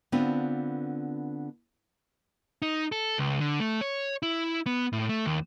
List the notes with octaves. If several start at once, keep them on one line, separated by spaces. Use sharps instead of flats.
D3 B3 C4 D4 F4 B4
D#4
A4
C#2
D3
A3
C#5
E4
B3
A2
A3
D#2